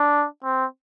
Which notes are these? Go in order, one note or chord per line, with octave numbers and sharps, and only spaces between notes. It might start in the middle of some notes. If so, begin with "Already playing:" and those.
Already playing: D4
C4